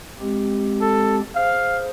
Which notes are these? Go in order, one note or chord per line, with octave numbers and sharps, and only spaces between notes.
G#3 C4 G4
A4
G#4 C5 F5